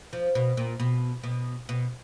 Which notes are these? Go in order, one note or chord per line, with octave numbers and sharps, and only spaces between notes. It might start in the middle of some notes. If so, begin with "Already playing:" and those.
F3
B2
A#2
B2
B2
B2